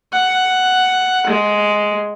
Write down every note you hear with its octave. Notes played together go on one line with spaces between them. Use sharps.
F#5
G#3